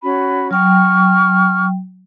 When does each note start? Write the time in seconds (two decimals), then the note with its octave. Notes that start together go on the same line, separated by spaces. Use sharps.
0.03 C#4 F#4 B5
0.51 F#3 G5 C#6 F6